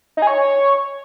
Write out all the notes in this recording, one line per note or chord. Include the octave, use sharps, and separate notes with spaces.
D#4
G#4
C#5